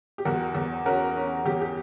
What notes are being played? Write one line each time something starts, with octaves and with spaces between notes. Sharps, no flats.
G4
E2 F#4 A#4
E2
C#4 F#4 A#4
C#4
E2 G4
G4